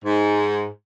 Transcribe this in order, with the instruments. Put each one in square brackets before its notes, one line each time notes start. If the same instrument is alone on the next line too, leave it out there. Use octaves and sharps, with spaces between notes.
[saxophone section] G#2